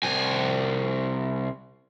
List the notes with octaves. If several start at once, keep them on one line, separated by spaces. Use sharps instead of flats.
C2 G#5